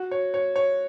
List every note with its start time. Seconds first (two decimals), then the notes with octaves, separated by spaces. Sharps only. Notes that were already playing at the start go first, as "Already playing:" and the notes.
Already playing: F#4
0.11 C#5
0.34 C#5
0.56 C#5